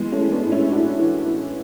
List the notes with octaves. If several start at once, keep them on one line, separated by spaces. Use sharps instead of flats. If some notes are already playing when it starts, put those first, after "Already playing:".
Already playing: E3 G#3 B3
A3 C#4
E3
B3 D4
A2
C#4 E4
A2 D4 F#4
E3
E3